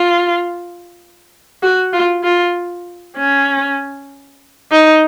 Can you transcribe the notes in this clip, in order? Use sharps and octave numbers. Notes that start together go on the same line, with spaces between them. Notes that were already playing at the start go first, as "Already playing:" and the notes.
Already playing: F4
F#4
F4
F4
C#4
D#4